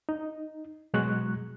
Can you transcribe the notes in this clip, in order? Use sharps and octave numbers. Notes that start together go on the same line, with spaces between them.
D#4
B2 F#3 G#3 C#6 F#6